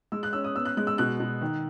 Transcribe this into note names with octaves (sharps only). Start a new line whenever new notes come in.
G#3 E6
F#6
C#4 E6
D#6
B3 E6
F#6
G#3 F#6
E6
B2 F#6
B2
D#3